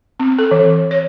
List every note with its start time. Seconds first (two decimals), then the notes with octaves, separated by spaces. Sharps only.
0.20 C4
0.39 A4
0.51 E3
0.91 C#5